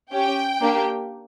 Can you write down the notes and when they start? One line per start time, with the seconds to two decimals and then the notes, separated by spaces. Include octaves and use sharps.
0.12 C#4 G4 G5
0.61 A#3 D4 G4